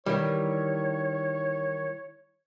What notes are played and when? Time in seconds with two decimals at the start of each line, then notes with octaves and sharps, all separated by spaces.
0.06 D#3 E3 G3 E4 C#5